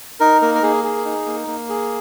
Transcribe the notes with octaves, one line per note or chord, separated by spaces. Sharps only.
D#4 A#4
A#3 A#4
A#4
A#3 G#4
G#4
D#4
A#3
A#3
G#4